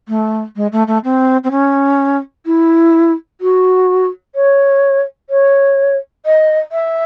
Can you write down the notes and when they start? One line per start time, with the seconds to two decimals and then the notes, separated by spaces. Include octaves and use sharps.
0.08 A3
0.56 G#3
0.72 A3
0.87 A3
1.04 C4
1.44 C4
1.51 C#4
2.46 E4
3.41 F#4
4.35 C#5
5.30 C#5
6.26 D#5
6.72 E5